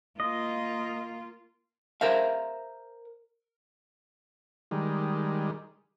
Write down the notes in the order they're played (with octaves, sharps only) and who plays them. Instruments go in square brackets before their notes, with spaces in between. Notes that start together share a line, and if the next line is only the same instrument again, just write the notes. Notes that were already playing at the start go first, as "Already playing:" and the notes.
[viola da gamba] A#3 F4 [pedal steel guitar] D#5
[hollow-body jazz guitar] A#4 C5 E5 F5
[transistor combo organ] D#3 G3 G#3